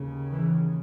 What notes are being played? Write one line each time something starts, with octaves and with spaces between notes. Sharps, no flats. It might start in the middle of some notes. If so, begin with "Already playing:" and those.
Already playing: D#2 C#3
E3